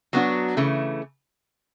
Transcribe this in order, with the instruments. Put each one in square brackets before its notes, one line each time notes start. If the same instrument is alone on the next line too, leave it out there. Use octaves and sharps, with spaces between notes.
[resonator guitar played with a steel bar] F#3 B3 D4 F#4
C#3 E3 A3